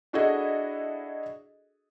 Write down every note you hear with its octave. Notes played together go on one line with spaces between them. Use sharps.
D4 E4 F#4 G#4 A4 D#5